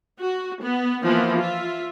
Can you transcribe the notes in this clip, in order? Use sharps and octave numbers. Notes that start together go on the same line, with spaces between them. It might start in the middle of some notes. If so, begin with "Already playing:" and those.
F#4
B3
E3 F3 A#3 B3
F4 E5